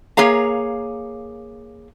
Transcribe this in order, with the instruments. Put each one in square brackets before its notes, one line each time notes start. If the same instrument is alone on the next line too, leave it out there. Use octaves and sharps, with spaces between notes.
[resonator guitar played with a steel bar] A#3 G#4 C#5 F5 A#5